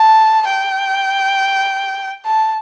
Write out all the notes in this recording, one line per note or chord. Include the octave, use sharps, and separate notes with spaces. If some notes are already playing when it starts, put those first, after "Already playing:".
Already playing: A5
G5
A5